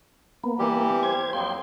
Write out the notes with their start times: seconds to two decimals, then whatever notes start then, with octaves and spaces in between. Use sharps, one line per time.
0.44 A#3 B3
0.59 E3 G3 G4
1.03 C5 G#6
1.33 F2 F#3 A#3 G5 C6